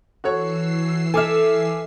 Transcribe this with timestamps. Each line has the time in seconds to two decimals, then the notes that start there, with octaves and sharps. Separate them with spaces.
0.24 E3 F#4 A4 C#5 E6 C7
1.14 A4 E5 G#5 D6 F6